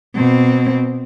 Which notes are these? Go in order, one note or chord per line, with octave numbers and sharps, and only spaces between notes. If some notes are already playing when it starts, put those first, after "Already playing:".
B2 C4